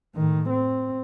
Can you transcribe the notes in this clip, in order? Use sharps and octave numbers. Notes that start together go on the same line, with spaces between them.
A2 D#3
C4